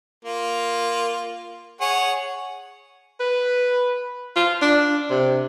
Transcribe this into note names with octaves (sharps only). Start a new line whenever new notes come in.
A#3 F4
G#4 C#5 F#5
B4
F4
D4
C3